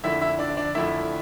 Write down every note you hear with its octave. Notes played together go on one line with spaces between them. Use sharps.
F2 D3 A3 E4 E5
E4 E5
D4 D5
D4 D5
F2 D3 A3 E4 E5